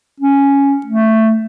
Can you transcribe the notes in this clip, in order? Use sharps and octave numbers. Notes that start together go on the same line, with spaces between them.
C#4
A3